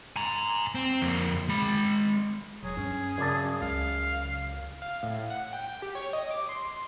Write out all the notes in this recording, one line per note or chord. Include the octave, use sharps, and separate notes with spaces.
G#5 A#5
C4
F2 A#3
G#3 B5
E1 F#3 G#4
G2 C#4
F#2 C#3 D5 A5
C#2 F5
F5
A2
F#5
G5
G4
C#5
D#5
D6
C6